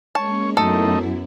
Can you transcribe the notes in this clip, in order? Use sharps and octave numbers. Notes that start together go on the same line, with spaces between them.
G#3 A#3 C#4 C#5 A5
F#2 A3 B3 D#4 E4 A4